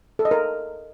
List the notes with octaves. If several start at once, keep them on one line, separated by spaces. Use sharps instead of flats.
A4
D#5
A#4